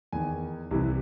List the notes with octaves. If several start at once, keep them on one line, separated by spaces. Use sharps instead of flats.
E2 D#3 G#5
C2 C3 E3